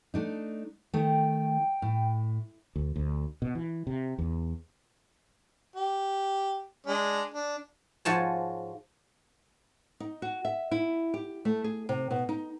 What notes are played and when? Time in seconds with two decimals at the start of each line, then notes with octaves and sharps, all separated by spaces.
0.14 A3 D4 D#4
0.93 D#3 A3 G5
1.82 A2
2.76 D2
2.96 D2
3.42 B2
3.55 E3
3.87 C3
4.19 E2
5.76 G4
6.87 G#3 D4
7.34 D4
8.05 G#2 F3 F#4 C#5 G#5 A5
10.00 D#4
10.22 F#4
10.45 E5
10.71 E4
11.14 G4
11.45 A3
11.64 G#4
11.89 C3
12.11 B2
12.29 D#4